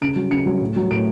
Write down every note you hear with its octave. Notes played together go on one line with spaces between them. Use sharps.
C#3 D7
F#3
C#3 C#7
F#3
A2
F#3
A2 D7